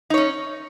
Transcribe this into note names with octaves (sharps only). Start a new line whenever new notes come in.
C#4 D#4 C#5